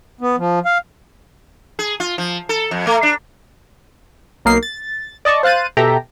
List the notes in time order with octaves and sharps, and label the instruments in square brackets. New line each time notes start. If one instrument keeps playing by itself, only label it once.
[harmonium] B3
F3
F5
[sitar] G#4
F4
F3
A4
F2
A3
D4
[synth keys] B1 A#3 D#4 A#4 C7
A6
D5 D#5 A5 C#6
C5 F5 F#6 A6 D#7
B2 G4 A4 E5 G5 A#5